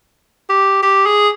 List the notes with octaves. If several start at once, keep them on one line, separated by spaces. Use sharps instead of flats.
G4
G4
G#4